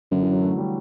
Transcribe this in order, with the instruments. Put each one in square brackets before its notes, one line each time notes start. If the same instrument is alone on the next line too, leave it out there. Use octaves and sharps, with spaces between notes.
[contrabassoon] F#2 [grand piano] D3
[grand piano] E3
F#3
A3
G3